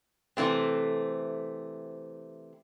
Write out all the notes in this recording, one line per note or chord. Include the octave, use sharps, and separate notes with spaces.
C3 E3 A3 C4